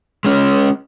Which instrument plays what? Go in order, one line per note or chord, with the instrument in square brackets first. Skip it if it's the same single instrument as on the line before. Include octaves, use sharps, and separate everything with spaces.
[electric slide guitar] G#3 C#4